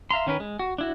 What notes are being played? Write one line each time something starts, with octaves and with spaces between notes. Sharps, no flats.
E5 F5 A#5 C6
D#3 C#4 A#4 B4
G#3
F#4
D4 E4 F#4